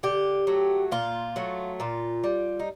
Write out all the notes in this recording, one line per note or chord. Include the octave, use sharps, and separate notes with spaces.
D3 G4
F#3 A3
A#2 F4
F#3 A3
A#2 F4
G3
D#4